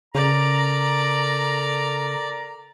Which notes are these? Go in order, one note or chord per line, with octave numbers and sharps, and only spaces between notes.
C#3 A4 A#4 D5 A#5